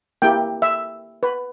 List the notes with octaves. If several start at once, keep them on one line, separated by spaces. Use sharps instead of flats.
A#3 E4 G4 G5
E5
B4